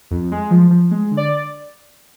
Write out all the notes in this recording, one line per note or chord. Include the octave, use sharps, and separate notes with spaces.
F2
G#3
F3
F3
G#3
D3
D5